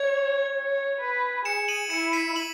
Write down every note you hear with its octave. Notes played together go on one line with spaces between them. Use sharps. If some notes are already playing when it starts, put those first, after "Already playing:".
Already playing: C#5 G#6
C#5
B4
G#4 C#7 E7
D#7 F#7
E4 C#7 E7
B6 D#7
D#7 F#7